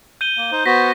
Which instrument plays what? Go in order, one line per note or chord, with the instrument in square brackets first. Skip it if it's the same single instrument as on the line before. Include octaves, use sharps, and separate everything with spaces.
[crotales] G6 D#7 G7
[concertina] A#3
D#4 C5
[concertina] B3 F#4 C5 [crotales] A#6 B6